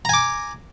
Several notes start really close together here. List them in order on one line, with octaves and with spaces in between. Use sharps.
A#5 G#5 D6